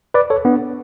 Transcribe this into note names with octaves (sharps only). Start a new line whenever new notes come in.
B4 D5
A4 C#5
B3 D4